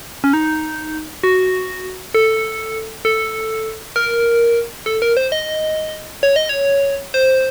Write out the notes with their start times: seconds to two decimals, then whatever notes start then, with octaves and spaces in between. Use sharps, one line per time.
0.24 C#4
0.33 D#4
1.24 F#4
2.15 A4
3.05 A4
3.96 A#4
4.86 A4
5.02 A#4
5.17 C5
5.32 D#5
6.23 C#5
6.36 D#5
6.49 C#5
7.14 C5